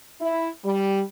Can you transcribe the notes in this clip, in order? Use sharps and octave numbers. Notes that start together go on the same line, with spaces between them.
E4
G3